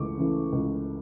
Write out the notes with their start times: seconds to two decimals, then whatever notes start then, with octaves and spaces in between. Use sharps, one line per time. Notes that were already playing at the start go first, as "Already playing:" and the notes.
Already playing: C#2 C#3 E3 A3 C#6 D6
0.17 C#3 E3 A3
0.52 C#2